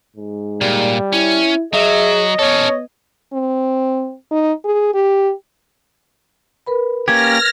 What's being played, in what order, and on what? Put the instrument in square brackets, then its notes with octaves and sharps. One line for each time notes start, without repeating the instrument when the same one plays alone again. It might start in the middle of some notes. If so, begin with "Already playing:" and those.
[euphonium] G#2
[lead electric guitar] A#2 [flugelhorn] G3
[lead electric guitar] C#4 [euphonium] E4
[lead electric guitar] F#3 [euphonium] G#4 [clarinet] D#5 [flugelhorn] E5
[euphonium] B3 [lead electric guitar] C#4 A4 [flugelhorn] C#5
[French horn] C4
D#4
G#4
G4
[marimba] A#4 B4 B5
[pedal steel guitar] A#3 C#4 G4 [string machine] F6 A#6 [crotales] G#6